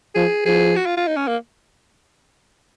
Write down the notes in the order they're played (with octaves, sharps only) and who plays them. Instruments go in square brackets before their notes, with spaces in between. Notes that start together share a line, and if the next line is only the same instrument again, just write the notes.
[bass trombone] F3 [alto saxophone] G#4
[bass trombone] F3 [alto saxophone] G#4
[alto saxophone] F#4
F4
F4
D#4
C#4
A#3